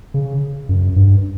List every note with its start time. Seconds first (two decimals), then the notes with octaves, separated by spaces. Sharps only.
0.14 C#3
0.69 F#2
0.96 G2